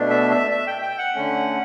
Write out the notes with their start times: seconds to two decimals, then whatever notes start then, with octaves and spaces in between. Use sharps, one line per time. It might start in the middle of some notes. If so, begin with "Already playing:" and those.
Already playing: B2 A3 D4
0.10 E5
0.31 E5
0.51 E5
0.67 G5
0.82 G5
0.99 F#5
1.15 D3 A3 C#4